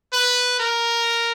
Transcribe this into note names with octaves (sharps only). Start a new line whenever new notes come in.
B4
A#4